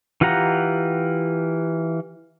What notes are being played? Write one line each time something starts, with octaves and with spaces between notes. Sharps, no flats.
E3 F4 G4 F#5 A#5